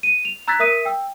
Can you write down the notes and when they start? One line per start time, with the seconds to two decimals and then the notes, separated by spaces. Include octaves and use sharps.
0.03 D#7
0.25 F7
0.48 A#5 E6 F#6 G#6 A6 B6
0.59 A#4 E5 D#6 B6 D#7
0.85 G5 E6